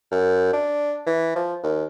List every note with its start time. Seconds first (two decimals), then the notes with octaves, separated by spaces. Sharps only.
0.12 F#2
0.53 D4
1.07 E3
1.36 F3
1.64 D#2